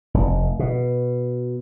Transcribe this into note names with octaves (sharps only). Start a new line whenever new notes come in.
F1
B2